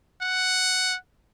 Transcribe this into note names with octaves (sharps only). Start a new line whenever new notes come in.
F#5